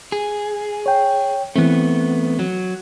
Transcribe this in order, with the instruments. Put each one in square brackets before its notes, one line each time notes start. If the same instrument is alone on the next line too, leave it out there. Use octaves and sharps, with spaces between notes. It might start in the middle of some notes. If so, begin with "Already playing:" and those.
[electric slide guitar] G#4
[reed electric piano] C#5 G5
[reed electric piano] E3 C4 [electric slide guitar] A3 B3
[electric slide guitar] F#3